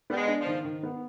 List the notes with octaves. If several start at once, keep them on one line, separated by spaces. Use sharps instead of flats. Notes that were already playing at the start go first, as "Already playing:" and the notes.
G3 B3
G#3
D4
F3
D#3
D#3
B3